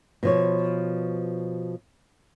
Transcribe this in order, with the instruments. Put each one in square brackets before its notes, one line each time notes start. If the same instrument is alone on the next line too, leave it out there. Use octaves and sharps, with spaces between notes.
[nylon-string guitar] B2 F3 C#5